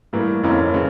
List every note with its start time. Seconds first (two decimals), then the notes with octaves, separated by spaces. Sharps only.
0.13 A2 E3 G3 A#3
0.43 F1 F2 E3 A#3 C#4
0.74 C#3